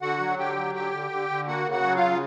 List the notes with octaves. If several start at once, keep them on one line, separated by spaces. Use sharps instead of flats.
D3 F#4 F#5
F#3
D3 G4 G5
F#3
D3 G4 G5
D3
D3
D3
A#3 F#4 F#5
C#3
F#4 F#5
F#3
F4 F5
C#3